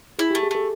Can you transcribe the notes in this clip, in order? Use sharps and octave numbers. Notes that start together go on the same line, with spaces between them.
E4 G#4
A3 G4
G#4
A3 A4